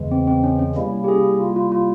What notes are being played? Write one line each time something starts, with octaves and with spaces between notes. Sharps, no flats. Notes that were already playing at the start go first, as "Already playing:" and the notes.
Already playing: E2 C#3 E3 G#3
C4
C4
C#4
C#4
C3 G3 A#3 C#4 E4
G4
G#4
F4
F4
F4